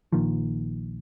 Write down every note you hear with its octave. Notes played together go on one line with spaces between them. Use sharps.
A#1 A#2 D#3 F3